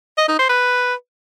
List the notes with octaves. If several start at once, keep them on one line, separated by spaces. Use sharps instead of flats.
D#5
D#4
C5
B4